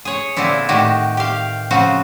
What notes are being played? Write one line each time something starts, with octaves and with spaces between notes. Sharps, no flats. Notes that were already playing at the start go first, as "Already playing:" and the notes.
G#4 C#5
A#2 D3 C4 D4 E4
A2 D#3 F#4 G4
G4 F5
C#3 F3 C4 F#4